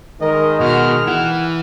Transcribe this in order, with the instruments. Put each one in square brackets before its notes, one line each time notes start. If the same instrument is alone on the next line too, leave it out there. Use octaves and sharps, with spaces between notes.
[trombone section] D#3 G#3 [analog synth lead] A#4 [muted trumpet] D#5
[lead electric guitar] B2 [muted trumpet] F#4 [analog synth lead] F6
[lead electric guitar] E3 E4 [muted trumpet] F#5